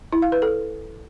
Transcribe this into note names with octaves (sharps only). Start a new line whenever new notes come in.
E4
F5
B4
A4